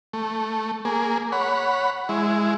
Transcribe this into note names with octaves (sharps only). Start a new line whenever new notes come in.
A3
A#3 G#4
C#5 F#5 B5
G#3 E4